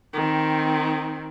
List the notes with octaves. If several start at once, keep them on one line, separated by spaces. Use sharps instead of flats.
D#3 C4